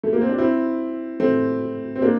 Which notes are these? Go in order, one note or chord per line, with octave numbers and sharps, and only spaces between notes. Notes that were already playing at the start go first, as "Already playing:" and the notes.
A3
A#3
C4
D4
C4 E4
A3 C4
C4
A#3 D4